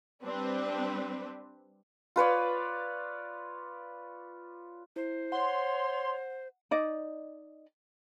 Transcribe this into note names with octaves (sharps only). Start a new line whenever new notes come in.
G3 C4 D4 B4
F4 B4 C#5 D5
E4 C5
C#5 F#5 C6
D#4 D5 D#5